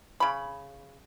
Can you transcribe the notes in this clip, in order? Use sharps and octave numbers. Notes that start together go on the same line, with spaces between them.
C#3 B5